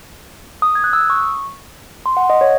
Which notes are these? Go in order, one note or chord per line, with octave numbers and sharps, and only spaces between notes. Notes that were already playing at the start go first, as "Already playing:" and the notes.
D#6
G#6
F#6
E6
D#6
C#6
C6
F#5
D#5
C#5